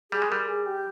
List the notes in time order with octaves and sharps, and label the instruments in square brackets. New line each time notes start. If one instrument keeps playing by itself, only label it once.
[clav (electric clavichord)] G3 [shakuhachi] G#4
[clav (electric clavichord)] G#3
[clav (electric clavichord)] G3 [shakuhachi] A#4
[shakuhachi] G#4
G4